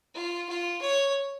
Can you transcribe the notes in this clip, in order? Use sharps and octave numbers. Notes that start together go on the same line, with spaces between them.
F4
F4
C#5